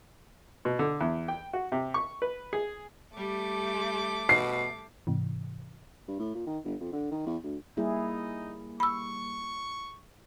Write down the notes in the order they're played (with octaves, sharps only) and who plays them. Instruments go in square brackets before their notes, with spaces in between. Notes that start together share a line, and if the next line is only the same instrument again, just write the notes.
[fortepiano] B2
D3
E2
G5
F#4
C3
C#6
B4
G#4
[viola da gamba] G3 [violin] A3 D6
[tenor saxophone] B2 [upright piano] C7
[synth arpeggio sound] G#2 C3 E3
[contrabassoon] G2
A2
A#2
D#3
G1
F2
D3
D#3
E2
D2
[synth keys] G3 A#3 [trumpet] D#4 [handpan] E4 G#4
[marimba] B5 E6 [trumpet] C#6